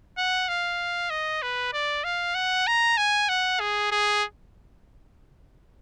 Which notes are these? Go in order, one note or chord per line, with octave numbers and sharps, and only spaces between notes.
F#5
F5
D#5
B4
D5
F5
F#5
A#5
G#5
F#5
G#4
G#4